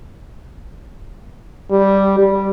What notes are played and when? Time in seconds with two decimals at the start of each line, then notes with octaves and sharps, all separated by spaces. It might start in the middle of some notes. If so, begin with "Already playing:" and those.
1.71 G3
2.19 G3